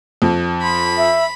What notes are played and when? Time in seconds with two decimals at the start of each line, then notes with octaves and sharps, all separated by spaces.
0.22 F2
0.62 B5 C6
0.98 E5